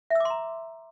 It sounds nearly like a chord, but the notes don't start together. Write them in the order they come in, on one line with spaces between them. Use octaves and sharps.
E5 E6 D6 C6 A#5